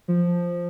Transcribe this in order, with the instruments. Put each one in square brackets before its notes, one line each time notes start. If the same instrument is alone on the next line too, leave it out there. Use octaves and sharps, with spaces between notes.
[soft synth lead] F3